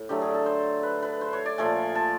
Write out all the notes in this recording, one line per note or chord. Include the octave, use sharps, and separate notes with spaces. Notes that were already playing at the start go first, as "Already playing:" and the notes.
Already playing: A2
D3 F#3 A3 G4
G#4
A4
C5
B4
B4
C5
C#5
D5
A#2 F3 A3 G#5
A5